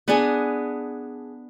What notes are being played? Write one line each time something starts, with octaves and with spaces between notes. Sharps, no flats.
B3 D4 G#4